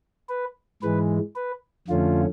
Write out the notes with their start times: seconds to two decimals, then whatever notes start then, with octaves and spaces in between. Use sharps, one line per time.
0.29 B4
0.82 G#2 E3 G#3 B4
1.36 B4
1.88 F2 D3 F3 A3 C#4 F4